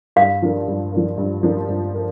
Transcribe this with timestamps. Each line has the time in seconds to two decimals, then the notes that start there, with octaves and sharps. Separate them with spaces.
0.16 G2 F5
0.42 F3 D4 A#4
0.68 G2
0.93 F3 D4 A#4
1.18 G2
1.43 F3 D4 A#4
1.69 G2
1.94 A#4